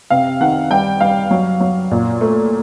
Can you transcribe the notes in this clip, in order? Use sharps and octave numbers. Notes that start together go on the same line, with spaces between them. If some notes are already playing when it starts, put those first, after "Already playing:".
C3 F5
D#3 F#5
G3 G5
G3 F5
F#3
F#3
A#2
A3